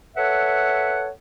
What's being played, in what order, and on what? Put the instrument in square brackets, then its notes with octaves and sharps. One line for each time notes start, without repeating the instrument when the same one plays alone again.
[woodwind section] A4 B4 C#5 E5 F#5